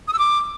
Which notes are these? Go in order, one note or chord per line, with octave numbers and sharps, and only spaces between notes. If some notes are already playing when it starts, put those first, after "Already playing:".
D#6
E6
D6